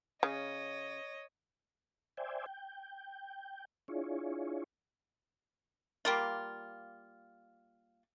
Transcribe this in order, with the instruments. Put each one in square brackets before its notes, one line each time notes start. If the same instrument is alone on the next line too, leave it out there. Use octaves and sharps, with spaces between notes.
[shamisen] C#3 [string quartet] C#5 D#5
[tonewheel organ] C5 D5 E5 G5 G#5
G5
D4 E4 F4 G#4 C#5
[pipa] G3 A#3 F4